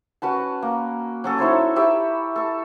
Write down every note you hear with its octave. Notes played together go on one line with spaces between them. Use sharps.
C#4 F#4 B4 A5
A#3
F#3 C#4 A4
D#4 E4 C5 C#5
G4 C#5 E5 B5
A4 C#6